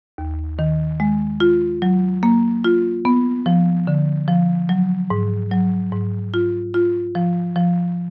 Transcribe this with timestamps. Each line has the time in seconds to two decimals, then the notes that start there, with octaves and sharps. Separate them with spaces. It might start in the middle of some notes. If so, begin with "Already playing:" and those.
0.18 D#2
0.59 D#3
1.00 G#3
1.40 F4
1.82 F#3
2.23 A#3
2.64 F4
3.05 B3
3.46 F3
3.87 D3
4.28 F3
4.69 F#3
5.10 G#2
5.51 F#3
5.92 G#2
6.34 F4
6.74 F4
7.15 F3
7.56 F3